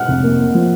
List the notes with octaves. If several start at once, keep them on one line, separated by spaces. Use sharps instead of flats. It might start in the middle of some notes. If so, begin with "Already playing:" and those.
Already playing: F#5 F6 F#6
F1
A#3
A#3
F3